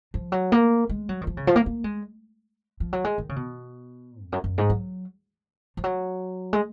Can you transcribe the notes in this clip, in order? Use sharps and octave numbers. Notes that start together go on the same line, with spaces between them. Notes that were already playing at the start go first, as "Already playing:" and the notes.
F3
F#3
A#3
G#3
F#3
D#3
F3
C#3
F3
A#3
A#3
G#3
F3
F#3
G#3
D#3
C#3
B2
F2
F#2
F#2
G#2
F#3
F3
F#3
G#3